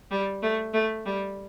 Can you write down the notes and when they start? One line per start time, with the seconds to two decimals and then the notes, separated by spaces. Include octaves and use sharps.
0.11 G3
0.43 A3
0.74 A3
1.06 G3